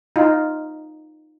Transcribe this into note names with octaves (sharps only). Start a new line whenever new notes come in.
D#4 F4